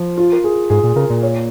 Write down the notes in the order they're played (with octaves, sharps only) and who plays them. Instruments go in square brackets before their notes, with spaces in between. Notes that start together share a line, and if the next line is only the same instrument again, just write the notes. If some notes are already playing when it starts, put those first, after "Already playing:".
Already playing: [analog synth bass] F3
[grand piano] F4
A#4
G#4
[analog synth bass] G#2 [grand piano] G#4
[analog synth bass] A#2
[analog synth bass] C#3 [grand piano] A#4
[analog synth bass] A#2
[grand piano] C#5